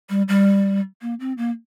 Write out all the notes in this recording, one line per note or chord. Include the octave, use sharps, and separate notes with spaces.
G3
G3
A#3
C4
A#3